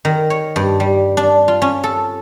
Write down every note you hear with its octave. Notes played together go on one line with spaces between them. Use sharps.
D#3
C#5
G2
G3
D4
F4
C#4
A4